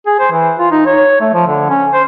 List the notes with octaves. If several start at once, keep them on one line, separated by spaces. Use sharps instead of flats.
G#4
C5
E3
F4
D#4
C#5
A3
F3
D3
C#4
C5